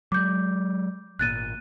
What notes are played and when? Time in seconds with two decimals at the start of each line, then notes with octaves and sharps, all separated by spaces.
0.12 F#3 G#3 D6 G6
1.19 G#1 A#2 F#6 A6 D#7